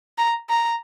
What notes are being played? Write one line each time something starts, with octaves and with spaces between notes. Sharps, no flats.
A#5
A#5